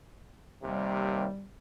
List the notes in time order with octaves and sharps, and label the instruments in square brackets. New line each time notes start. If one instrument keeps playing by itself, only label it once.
[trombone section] D#2 C3 [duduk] G3